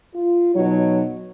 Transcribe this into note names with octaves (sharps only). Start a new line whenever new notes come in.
F4
B2 F#3 D#4 C#5